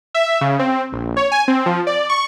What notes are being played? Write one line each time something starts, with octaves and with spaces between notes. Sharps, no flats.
E5
C#3
C4
A#1
C#5
G#5
C4
F3
D5
C#6